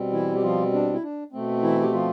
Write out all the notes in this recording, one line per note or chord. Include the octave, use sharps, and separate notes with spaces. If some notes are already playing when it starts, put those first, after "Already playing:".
Already playing: B2 G3 C4
E3 E4
G4
F3 F4
D4
E4
D4
B2 A3 C4
E3 E4
G4
F3 F4